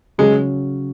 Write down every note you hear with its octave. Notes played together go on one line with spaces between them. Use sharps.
C#3 F#3 G#3 C#4